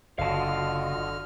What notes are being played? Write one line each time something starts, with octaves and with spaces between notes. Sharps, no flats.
F#1 D3 F4 F#4 D#5 F5 A5 F6